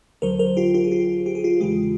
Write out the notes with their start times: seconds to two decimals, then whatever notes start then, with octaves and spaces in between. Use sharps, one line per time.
0.22 D2 D3 F#3 A#4 C5
0.39 A#4 C5
0.57 F4 G4
0.74 F4 G4
0.84 G#4
0.91 F4 G4
1.26 G4
1.35 G#4
1.44 F4 G4
1.60 E2 C#3 E3 G#3 F4 G4